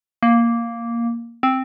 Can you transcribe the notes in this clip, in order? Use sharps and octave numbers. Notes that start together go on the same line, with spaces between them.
A#3
C4